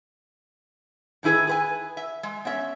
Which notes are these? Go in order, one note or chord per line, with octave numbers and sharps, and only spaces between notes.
A2 D#3 E4 G#4 B4
G#4 B4 G#5
E5
G#3
B3 C#4 E5